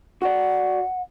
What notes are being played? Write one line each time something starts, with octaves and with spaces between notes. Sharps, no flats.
F#4 D5 F#5